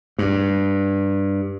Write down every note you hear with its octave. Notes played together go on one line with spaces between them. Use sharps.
G2